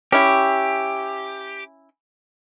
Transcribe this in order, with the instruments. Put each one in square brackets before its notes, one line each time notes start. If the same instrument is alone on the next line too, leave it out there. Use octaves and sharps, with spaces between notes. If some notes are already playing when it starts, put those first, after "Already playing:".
[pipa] C#4 E4 [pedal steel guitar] G4